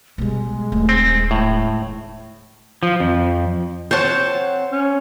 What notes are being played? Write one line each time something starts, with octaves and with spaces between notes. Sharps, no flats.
B2 G3 G#3
D#1 A3
C4
A2
F3
F2
C4 C5 C#5 F#5 A5
C#4